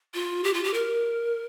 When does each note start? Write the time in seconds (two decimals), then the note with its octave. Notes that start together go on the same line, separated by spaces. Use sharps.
0.14 F4
0.44 G4
0.54 F4
0.64 G4
0.74 A#4